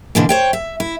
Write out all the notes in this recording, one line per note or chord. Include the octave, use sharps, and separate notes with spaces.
B2 D3 E3 A#3
C5 C#5 G5
E5
E4